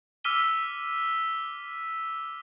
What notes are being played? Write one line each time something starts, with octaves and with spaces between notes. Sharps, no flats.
D6 E6 F6 B6 D#7 G7